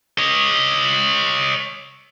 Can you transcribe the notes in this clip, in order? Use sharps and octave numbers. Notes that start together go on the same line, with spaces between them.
C#5 D#5